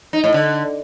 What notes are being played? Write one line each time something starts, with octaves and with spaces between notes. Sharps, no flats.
D#4
A2
D3